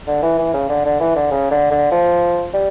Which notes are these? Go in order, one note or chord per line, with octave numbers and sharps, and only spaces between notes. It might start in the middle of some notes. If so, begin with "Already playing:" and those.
D3
E3
E3
C#3
D3
D3
E3
D3
C#3
D3
D3
F3
G3